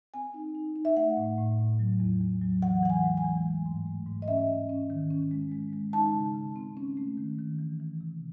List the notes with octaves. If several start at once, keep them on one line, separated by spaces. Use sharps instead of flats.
C4 G#5
D#4
D#4
D#4
E5
A3 F#5
A2
A2
A2
F#3
E2
E2
F#3
E3 F#5
E3 F#5
G#5
G#3
G#5
E3
A3
G#2
A3
G#2
D#5
C#4 E5
C#4
C#4
D#3
C#4
G#3
G#3
G#3
D#4 A5
C#3
C#3
C4
C#4
A3
D#3
D#3
E3
E3
C3